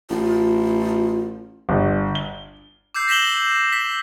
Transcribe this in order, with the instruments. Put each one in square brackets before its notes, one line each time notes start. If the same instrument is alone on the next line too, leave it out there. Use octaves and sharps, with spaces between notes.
[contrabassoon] A1 [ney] F4
[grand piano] G1
G7
[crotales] D6 E6 G6 C7
A#6 B6 E7 F#7 G7
B6